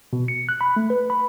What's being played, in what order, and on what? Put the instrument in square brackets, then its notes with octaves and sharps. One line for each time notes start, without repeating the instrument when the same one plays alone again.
[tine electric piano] B2
C#7
F#6
B5
A3
B4
B5